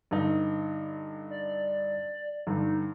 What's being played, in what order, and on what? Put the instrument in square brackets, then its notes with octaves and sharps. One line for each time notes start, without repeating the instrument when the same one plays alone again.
[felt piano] G2 D3 D#4
[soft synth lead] D5
[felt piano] G2 D3 [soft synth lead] D#4